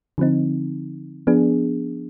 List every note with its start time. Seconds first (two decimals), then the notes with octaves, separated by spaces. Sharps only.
0.18 D3 F3 C4 D#4
1.27 F3 B3 D4 G#4